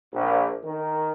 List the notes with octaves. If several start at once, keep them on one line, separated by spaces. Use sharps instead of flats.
A#1
D#3